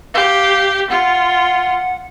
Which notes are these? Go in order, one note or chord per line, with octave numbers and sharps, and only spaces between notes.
G4 F5
F4 F#5